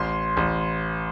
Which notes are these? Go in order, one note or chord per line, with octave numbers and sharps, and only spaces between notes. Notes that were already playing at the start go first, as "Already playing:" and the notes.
Already playing: A1 C6
A1